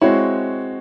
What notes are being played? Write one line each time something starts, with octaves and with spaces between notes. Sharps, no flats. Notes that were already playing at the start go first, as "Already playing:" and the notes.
G#3 C4 E4 F#4 C#5